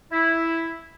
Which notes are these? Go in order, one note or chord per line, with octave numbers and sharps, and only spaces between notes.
E4